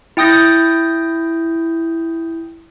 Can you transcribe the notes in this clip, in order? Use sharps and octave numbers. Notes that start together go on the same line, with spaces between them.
E4 G5 D#6 G6 A#6